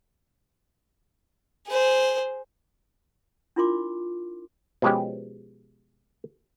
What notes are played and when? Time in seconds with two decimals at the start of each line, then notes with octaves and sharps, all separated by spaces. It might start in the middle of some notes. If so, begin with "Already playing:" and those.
1.68 G#4 C5
3.56 D4 E4 F4 A#4 C6 D6
4.82 B2 F3 G#3 C#4 G4